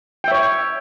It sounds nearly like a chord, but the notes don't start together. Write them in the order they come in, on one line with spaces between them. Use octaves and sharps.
G5 E5 C#5